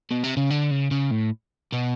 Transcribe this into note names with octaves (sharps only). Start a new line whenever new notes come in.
B2
C3
C#3
D3
C#3
C#3
A2
B2